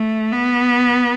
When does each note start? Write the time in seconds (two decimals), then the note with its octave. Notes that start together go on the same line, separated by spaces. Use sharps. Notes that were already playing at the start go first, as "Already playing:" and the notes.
Already playing: A3
0.32 B3